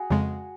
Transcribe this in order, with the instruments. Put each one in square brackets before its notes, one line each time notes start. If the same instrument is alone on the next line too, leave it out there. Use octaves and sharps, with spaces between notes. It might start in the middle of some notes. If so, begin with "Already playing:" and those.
Already playing: [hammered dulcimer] F#4 G#4
[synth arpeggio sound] F2 C#3 G#3